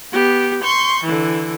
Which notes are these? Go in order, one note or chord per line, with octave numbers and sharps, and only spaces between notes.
B3 G4
C6 C#6 G6
D3 E3